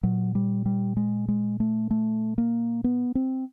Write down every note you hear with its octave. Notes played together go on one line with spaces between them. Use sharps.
A#2 F#3
G3
G3
G#3
G#3
A3
A3
A#3
B3
C4